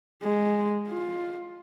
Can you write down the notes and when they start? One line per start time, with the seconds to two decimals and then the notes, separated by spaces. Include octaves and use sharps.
0.22 G#3
0.89 F4